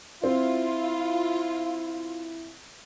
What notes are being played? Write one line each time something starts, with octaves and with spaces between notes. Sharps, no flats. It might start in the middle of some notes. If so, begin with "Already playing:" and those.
C4 E4 F4